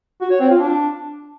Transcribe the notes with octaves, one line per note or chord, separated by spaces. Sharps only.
F#4
C#5
C4
F4
D4